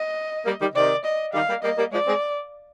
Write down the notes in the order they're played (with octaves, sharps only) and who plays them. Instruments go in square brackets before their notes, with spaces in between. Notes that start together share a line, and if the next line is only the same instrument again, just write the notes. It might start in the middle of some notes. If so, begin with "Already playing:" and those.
Already playing: [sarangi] D#5
[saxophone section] G3 A#3
D#3 G3
[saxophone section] C3 D#3 [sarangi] D5
[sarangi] D#5
[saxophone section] D#3 G3 [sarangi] F5
[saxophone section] G3 A#3
[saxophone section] G3 A#3 [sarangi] D#5
[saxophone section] G3 A#3
[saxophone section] F3 G#3 [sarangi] D5
[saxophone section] G#3 C4